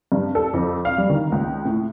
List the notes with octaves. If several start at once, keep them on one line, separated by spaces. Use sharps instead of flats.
G2
A4
F2
F5
G3
D#3
C#2
A2